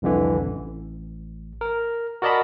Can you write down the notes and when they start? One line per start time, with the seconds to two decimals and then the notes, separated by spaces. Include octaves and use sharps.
0.02 C2 F2 D3 E3
0.46 A1
1.61 A#4
2.22 F#4 A#4 D5 D#5 A5 B5